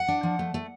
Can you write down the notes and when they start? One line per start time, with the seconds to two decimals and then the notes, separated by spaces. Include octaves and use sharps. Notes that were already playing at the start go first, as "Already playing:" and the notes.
Already playing: F#5
0.08 D4
0.23 F3
0.39 A3
0.54 A3